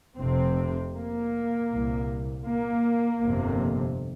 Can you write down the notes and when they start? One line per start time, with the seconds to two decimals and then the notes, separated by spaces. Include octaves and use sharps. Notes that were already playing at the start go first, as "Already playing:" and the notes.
0.17 F1 F2 C3 C4
0.94 A#3
1.71 C2 A#2
2.48 A#3
3.24 G1 F2 C3